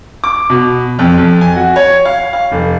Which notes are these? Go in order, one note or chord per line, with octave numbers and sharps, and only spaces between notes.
D6
B2
F2
F2
G#5
F#4
C#5
F5
F5
F1